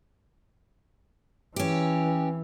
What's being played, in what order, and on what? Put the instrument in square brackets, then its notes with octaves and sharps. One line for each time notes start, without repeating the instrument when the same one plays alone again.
[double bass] E3 [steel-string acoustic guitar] C#4 G4